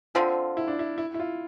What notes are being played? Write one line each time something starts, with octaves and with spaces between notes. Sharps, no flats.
D3 F3 C4 F4
E4
D4
E4
E4
E4
F4